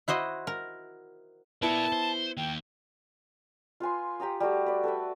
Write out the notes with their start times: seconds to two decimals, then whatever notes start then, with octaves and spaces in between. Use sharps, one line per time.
0.08 E4 F#4 C5 D#5
0.47 A#4
1.62 B3 E4 A#4 D5 A5 C#7
1.92 C5
2.37 D#3 A#3 G5
3.80 F4 B4 G#5 C6
4.20 G4 G5 A#5 D#6
4.40 G3 A3 F#4
4.66 B4 D5
4.84 A4 B4 D5 E5